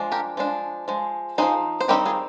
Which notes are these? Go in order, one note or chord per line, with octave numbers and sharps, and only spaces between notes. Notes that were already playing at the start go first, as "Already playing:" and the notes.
Already playing: F3 G#3 D4
G4 A#4
F3 G#3 D4
F3 G#3
F3 G#3 D#4 G#4 C5
C5
D#3 G3 C4 D#4 G4 A#4
F4 G#4